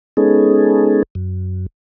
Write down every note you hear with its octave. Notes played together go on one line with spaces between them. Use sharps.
G#3 B3 C#4 D#4 G#4 A4
F#2